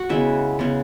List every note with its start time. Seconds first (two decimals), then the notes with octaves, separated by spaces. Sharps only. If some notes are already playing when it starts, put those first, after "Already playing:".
Already playing: F#4 F#5
0.09 C#3 G#3 B3 E4 E5
0.59 C#3 G#3 B3